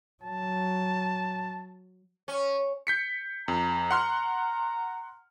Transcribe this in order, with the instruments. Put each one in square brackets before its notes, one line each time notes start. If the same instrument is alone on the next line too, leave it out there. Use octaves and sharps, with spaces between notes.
[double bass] F#3 [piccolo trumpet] A5
[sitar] C#4
[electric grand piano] G6 B6 C#7
[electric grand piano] F2 [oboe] A#5
[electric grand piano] F#5 C6 F6